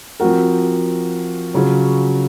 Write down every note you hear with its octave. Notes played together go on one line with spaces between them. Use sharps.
F3 C4 F#4 A#4
C#3 F#3 C#4 F4